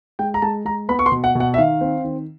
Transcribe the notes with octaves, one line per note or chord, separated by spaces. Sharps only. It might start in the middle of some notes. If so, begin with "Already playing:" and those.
G#3 G5
A#5
G#3 A5
G#3 A#5
B3 B5
C#6
C6
B2
F#5
B2 F#5
E5
D#3 F5
C4
D#3